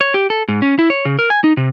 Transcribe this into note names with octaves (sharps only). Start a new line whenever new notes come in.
C#5
G4
A4
G#2
C#4
E4
C#5
C#3
A#4
G#5
D#4
C3